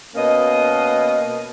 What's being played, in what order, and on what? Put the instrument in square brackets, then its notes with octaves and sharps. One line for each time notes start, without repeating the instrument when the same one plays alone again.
[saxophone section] B2 A#3 C#4 D#5